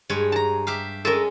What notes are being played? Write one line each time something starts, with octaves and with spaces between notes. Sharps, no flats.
G2 G#3 C#5
A5 A#5
G4 E5 F5
G#3 C#4 A4 A#4